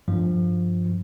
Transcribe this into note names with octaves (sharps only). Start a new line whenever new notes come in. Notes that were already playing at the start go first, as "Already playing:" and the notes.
G2 F3